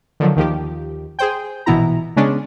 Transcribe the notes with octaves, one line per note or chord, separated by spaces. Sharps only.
D3 D#3 F3 F#3
D#2 D#3 F3 G4
G#4 C5 G5
A#1 B2 E3 B3 E4 A#5
C#3 G#3 B3 C#4 D4